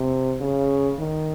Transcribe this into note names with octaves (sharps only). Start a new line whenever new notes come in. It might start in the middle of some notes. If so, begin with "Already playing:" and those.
Already playing: C3
C#3
D#3